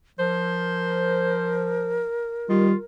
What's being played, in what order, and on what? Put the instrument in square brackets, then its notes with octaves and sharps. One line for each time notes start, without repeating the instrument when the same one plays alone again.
[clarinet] F3 [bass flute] A#4 [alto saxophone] C5
[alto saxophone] D#3 [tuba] G3 [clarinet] F4